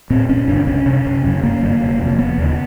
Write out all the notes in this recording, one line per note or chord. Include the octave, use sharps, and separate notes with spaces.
A#2 C4
F#1 C#4
F#2 C#3 D4
C2 C#4
C3
F#1
F#2 C#3
G1 A#3
G2 D3
F1
F2 C3
E1 B3
D#2 C#3